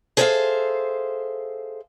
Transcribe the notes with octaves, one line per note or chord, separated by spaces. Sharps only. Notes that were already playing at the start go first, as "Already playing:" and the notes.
G#4 A4 C5 C#5 E5 F5